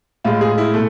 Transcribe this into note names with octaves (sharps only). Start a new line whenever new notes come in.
A2 G#3 F4
G#4
E4
B2 A3